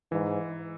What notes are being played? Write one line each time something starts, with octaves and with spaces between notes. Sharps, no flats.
G#2 E3